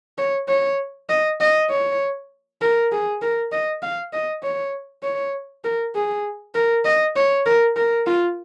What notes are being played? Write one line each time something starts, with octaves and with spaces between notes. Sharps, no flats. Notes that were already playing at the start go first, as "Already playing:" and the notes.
C#5
C#5
D#5
D#5
C#5
A#4
G#4
A#4
D#5
F5
D#5
C#5
C#5
A#4
G#4
A#4
D#5
C#5
A#4
A#4
F4